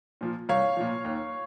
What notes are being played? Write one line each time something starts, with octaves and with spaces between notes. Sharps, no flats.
A#2 F3
C2 C#5 F5
A#2 F3
D#2